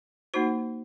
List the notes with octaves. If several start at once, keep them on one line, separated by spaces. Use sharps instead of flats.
A#3 D#4 F#4 C5